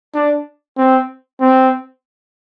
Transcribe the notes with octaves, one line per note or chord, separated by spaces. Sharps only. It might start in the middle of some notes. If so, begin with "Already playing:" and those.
D4
C4
C4